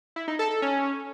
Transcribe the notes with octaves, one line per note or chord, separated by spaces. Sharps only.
E4
D#4
A4
A4
C#4